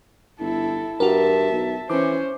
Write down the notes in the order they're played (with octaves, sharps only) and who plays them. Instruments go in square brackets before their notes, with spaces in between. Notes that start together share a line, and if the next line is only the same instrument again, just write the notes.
[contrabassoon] G1 [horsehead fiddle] E4 A4
[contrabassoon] G2 [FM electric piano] F#4 A#4 [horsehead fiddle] E5 A5
[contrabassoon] B1
[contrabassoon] E3 [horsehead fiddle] C#4 C5 [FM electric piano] D6